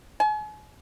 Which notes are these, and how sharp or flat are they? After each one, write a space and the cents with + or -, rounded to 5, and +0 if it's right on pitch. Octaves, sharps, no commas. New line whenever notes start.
G#5 +40